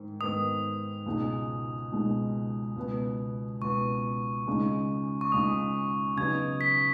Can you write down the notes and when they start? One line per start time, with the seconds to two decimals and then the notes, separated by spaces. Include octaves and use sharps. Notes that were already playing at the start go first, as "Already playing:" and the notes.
Already playing: G#2 D#3
0.20 G#2 D#3 B3 D#4 D#6
1.06 C#2 B2 G#3 D#4
1.92 C#2 B2 G#3 D#4
2.76 C#2 B2 B3
3.62 C#2 B2 B3 C#6
4.47 C#2 C#3 G#3 D#4
5.21 C#6
5.32 C#2 C#3 G#3 D#4 D#6
6.17 C#3 F#3 B3 D#4 G#6
6.61 B6